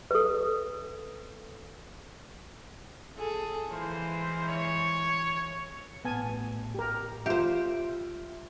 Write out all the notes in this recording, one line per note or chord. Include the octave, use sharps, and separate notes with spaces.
A4 B4
G#4 A4
E3 G#3 A#3 C5
C#5
A1 B3 G#5 A5
G4 A#4
F4 G4 C5 E5